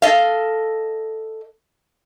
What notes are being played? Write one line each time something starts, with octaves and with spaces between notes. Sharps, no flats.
A4 D#5 F5